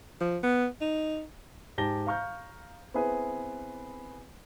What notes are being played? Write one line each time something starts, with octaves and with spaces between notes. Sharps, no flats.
F3
B3
D#4
G#2 G4 A5 A#6 G7
F5 A#5 C#6 F6 G6
B3 C4 E4 G#4 B4